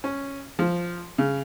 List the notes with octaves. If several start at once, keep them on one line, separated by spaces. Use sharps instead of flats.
C#4
F3
C#3